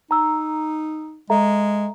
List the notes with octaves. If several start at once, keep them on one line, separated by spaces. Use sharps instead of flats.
D#4 A#5 E6
G#3 A4 E5 A#5